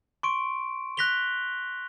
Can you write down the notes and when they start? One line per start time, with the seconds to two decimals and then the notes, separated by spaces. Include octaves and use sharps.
0.23 C6 C#6 D7
0.97 F#6 A#6 B6 F7 G7